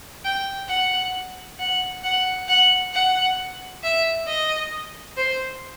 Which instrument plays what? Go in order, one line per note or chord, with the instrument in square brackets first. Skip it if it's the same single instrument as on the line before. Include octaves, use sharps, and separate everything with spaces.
[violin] G5
F#5
F#5
F#5
F#5
F#5
E5
D#5
C5